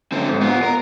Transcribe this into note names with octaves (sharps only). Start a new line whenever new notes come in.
D3 C4
G#2
B3 F4
A#4